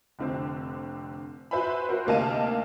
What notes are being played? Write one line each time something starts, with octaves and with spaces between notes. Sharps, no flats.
F1 D3 C4
F#4 B4 C5 E5 G#5 B5
F#4 A#4 C5
D2 C3 A#3 D#4 A5 D#7